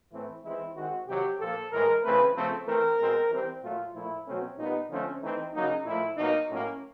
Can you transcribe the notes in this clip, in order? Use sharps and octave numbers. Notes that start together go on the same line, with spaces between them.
A2 E3 A3 C4 E4
E3 G#3 C4 E4
D#3 G#3 C4 F#4
C3 D#3 F#3 G4
A#2 F3 A#3 A4
A2 E3 G#3 A#4
C#3 E3 A3 C4 B4
C#3 F3 A3 C4 A4
E3 A3 C4 A#4
B2 G#3 C4
E3 G3 C4
A#2 F#3 A3 F4
A#2 F3 A3 E4
B2 F#3 A3 C4 C#4
A#2 G3 B3 D#4
D3 F3 A3 C4 C#4
E3 A3 C4 D#4
C#3 F#3 A#3 D#4
A#2 F3 A3 E4
B2 F#3 A#3 D#4
A2 F#3 A#3 C#4